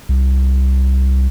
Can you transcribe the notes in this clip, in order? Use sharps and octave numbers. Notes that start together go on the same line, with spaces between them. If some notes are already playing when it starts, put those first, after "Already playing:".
C2